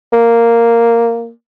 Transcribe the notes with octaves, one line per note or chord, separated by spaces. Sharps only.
A#3